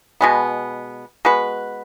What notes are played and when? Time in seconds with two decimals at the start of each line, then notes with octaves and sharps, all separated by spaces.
0.21 B2 G#3 B3
1.25 G#3 B3 F#4 B4